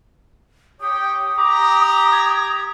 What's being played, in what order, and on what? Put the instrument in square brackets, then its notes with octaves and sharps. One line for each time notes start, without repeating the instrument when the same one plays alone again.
[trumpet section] G4 C#5 G5 [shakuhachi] D#6
[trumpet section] G4 A#5 [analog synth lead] D6
[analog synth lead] G#6